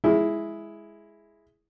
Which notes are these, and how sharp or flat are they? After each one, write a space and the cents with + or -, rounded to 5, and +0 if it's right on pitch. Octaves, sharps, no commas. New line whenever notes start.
G#3 +0 E4 +0